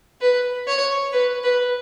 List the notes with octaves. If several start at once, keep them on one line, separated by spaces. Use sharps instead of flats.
B4
C#5
B4
B4